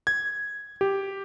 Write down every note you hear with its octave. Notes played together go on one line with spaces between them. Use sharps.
G#6
G4